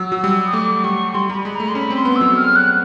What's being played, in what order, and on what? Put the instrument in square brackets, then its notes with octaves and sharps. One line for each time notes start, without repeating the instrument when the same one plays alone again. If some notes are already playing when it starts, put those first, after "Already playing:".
Already playing: [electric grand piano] F#3 [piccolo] E6
[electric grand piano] F#3
G3
[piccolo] D#6
[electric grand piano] A3 [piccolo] D6
[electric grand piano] G3 [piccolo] C#6
[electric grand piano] G3 [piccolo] C6
[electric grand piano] G3 [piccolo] A#5
[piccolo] B5
[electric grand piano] G#3
[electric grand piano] A3 [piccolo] A#5
[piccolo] C6
[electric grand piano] C#4 [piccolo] B5
[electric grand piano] C4
[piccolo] C6
[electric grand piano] B3
[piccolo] E6
[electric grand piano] F#3
[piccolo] F6
F#6